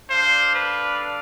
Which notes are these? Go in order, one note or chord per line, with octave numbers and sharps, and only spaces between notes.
D4 A4 C5 D5 F5
B4